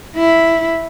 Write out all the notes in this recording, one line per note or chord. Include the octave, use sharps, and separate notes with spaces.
E4